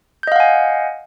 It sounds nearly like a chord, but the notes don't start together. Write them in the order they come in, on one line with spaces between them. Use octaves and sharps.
G6 D#5 F5 F#5 G#5